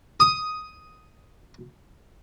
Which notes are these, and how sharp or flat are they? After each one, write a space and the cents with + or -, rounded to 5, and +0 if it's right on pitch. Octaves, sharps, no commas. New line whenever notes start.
D#6 +5